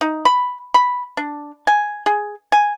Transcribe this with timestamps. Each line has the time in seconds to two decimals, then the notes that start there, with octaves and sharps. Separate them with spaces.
0.01 D#4
0.25 B5
0.74 B5
1.17 D4
1.67 G#5
2.06 G#4
2.52 G#5